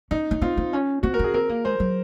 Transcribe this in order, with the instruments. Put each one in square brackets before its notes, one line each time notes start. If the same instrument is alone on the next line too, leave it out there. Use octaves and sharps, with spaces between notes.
[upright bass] C#4 [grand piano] D#4
[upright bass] C#4
[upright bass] C4 [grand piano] F4
[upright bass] C4
C#4
[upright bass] C4 [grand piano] F#4
[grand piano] A#4
[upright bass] C#4 [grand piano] G#4
[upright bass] C4 [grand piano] A#4
[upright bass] A#3
[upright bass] G#3 [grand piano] C5
[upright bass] F#3